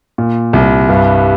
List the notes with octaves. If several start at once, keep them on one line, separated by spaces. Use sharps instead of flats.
A#2
C2
G2